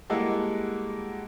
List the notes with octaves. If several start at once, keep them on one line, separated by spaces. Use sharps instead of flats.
G3 G#3 A#3 E4 F#4 A4